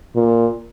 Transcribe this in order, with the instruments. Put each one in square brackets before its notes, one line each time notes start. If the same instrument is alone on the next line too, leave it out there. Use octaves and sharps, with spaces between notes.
[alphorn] A#2